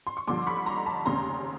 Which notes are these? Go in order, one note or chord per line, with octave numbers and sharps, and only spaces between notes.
C6
C#6
G2 D3 F3 C6 D6
B5 C#6
A#5 C6
A5 B5
F1 D#2 C#3 A#5 C6